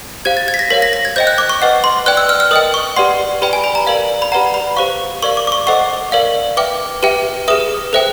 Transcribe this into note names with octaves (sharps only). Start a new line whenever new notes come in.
G4 C5 F5 G#6
A6
G#6
B6
A#6
A#4 C#5 F5 B6
A#6
A#6
G#6
C5 D#5 G5 G6
F#6
D6
C#6
B4 D#5 F#5
C6
B4 D5 G5 F#6
E6
F6
F6
A#4 D#5 G5 D#6
C#6
G4 B4 D5 F#5 C6
G4 B4 D5 G5 B5
G#5
B5
A#5
A#4 D5 F5
B5
G4 B4 D5 F#5 A#5
B5
G4 C5 F5 C#6
A#4 D5 F5 C#6
D6
D6
C#6
A4 C5 D#5 F#5 C#6
A#4 D5 F5
B4 E5 G5 D6
G4 B4 E5 G5
G#4 B4 E5 D#6
A4 C5 E5 G5